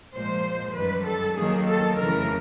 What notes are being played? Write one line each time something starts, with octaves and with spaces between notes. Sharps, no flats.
A#2 F3 G#3 C5
F#2 D#3 G3 B4
A4
D#2 D#3 F#3 A#3 G#4
A4
F2 C#3 E3 A3 A#4